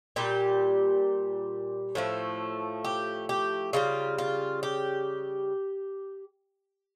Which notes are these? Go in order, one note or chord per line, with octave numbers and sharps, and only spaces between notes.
A#2 G3 G4
A2 F3 A3
G4
G4
C#3 G3 F4
F4
G4